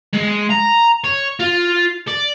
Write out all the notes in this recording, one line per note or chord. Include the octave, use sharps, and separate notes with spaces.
G#3
A#5
C#5
F4
D5